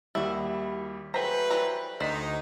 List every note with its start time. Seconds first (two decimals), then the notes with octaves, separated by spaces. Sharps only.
0.15 D#2 G3 E4 F#4
1.14 F#3 A3 G#4 B4 C5 G5 A#5 B6
1.50 E3 G3 A#5
2.00 D2 D#4 C5 D5 B6